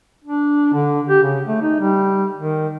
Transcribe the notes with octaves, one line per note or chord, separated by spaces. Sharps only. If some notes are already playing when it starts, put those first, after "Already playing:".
D4
D3
G4
C#3
A3
D#4
G3
D#3